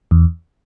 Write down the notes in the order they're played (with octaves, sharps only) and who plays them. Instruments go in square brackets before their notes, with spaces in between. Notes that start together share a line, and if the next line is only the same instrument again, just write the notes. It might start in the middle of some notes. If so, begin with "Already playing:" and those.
[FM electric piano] E2